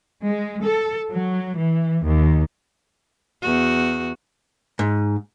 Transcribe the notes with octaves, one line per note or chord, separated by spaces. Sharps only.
G#3
A4
F#3
E3
D#2
E2 F#4
G#2